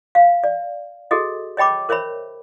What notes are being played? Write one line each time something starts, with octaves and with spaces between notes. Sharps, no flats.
F5
D5
F#4 G#4 A4 D#5
C#5 D#5 G5 B5 D6
A#4 C5 C#5 E5 B5